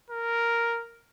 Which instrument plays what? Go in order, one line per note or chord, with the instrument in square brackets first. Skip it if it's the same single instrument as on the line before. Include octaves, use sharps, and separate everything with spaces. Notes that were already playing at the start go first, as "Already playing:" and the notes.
[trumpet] A#4